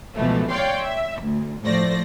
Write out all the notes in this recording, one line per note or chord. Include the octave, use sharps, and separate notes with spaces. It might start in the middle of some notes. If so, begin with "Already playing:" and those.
C#2 B2 E3 F3 A3
C#5 D5 F5 G5 C6
E5
D2
A2 F3 A3 C5 D5 A#6